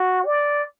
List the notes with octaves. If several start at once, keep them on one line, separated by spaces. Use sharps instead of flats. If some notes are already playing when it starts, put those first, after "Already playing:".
Already playing: F#4
D5